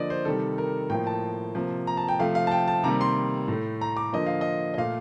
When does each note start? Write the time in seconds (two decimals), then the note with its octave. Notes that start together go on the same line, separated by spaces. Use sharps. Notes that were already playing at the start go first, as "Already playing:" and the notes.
Already playing: D3 F3 A#3 D5 D#5
0.10 C5
0.25 C3 D#3 G3 A4
0.58 A#4
0.90 A2 F3 A#3 G5
1.07 A5
1.55 C3 F3 A#3
1.87 A#5
1.97 A5
2.08 G5
2.19 C3 F3 A3 F5
2.35 F5
2.47 A5
2.52 G5
2.68 A5
2.83 C3 D#3 G3 A#3 A#5
3.01 C6
3.48 A2 A3
3.81 A#5
3.97 D6
4.13 D3 F3 A#3 D#5
4.26 F5
4.41 D#5
4.74 D#5
4.78 A#2 A3 F5